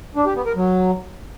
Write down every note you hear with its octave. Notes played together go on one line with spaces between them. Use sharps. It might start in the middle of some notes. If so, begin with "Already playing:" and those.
D4
G4
B3
A#4
F#3